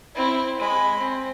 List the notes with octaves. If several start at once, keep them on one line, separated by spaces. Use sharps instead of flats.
C4 E4
G#3 B5
C4